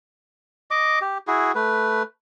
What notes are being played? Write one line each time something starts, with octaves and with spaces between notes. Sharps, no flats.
D#5 D6
G4
E4 F#4 G#4
A3 B4